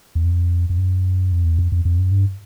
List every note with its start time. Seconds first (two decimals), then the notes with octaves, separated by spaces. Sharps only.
0.15 E2
0.25 F2
0.70 F2
0.78 F#2
1.32 F2
1.45 E2
1.59 F2
1.72 F2
1.85 F2
1.99 F#2
2.11 G2